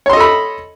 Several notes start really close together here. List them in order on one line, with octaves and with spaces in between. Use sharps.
C#5 C6 D#5 A4 B5